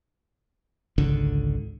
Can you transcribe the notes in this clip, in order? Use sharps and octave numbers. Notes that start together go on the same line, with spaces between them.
G#1 C#2 D3